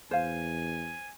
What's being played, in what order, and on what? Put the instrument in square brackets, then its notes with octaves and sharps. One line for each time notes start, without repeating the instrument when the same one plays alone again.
[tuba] E2 [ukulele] C5 F5 [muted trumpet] G#5